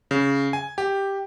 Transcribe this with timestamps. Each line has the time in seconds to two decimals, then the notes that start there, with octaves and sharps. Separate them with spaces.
0.11 C#3
0.53 G#5
0.78 G4